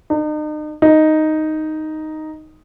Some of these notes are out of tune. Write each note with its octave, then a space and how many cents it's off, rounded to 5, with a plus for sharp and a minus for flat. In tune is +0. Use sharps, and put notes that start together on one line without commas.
D#4 -40
D#4 +0